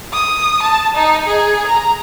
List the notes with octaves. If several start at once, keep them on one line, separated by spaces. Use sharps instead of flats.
D#6
A5
D#4
G#4
A#5